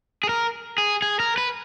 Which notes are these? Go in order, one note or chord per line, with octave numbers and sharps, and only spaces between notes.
G#4
A#4
G#4
G#4
A#4
B4